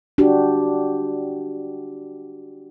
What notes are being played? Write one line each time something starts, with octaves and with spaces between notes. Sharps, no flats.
D4 F#4 G4